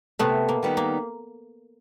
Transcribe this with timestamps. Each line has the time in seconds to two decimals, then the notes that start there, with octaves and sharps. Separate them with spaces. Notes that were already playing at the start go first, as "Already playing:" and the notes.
0.19 C3 A3 B3
0.49 A#3
0.63 D#3 G3 B3 D#4
0.77 A#3